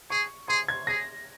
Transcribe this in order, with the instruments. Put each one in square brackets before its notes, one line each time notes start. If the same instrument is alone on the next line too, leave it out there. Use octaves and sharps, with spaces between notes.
[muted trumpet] G#4 [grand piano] C#6
[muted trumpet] G#4 [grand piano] C6
[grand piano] G#6
[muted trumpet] G#4 [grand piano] A#6